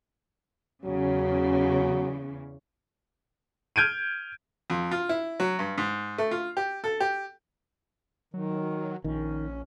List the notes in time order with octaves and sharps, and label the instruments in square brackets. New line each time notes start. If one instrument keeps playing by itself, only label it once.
[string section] E2 C#3 [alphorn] F#3
[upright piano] F6 G6 G#6 D7 D#7
[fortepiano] F2
F4
E4
F#3
G2
G#2
A3
F4
G4
A4
G4
[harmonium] D#3 [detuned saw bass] F#3
[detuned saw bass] A#1 [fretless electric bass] D#3 [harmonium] C#4